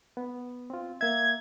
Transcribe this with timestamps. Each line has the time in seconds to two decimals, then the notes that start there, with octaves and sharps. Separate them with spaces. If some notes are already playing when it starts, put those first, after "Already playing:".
0.17 B3
0.70 C4 F4
1.01 A#3 E5 G#6